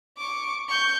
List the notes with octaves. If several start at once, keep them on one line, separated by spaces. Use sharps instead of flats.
C#6 D6
C#6 G6